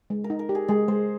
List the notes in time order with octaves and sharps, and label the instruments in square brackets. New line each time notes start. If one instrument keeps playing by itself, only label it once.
[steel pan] G#3
[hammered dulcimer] A#4
[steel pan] D#4
[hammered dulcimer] A#4
[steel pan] G4
[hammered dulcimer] G#4
[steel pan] G#3 [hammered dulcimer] G#4
[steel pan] G#3 [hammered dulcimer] C5